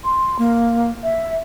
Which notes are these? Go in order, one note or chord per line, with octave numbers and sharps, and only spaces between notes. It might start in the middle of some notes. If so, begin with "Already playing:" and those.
C6
A#3
E5